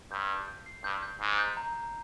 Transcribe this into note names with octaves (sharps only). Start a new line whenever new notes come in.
G2 G6
G6
G6
C7
G2 G6
G6
G#2 C7
G6
A#5